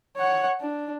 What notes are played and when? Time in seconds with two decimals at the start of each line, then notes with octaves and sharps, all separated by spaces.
0.17 C#5 F#5
0.60 D4